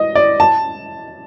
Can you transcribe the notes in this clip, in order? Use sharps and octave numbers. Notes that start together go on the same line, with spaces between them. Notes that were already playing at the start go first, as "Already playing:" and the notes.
Already playing: D#5
D5
A5